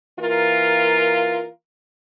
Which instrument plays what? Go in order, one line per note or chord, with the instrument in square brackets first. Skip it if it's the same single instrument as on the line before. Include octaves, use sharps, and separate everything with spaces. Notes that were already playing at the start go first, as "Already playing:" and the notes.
[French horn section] E3 A#3 F4 A#4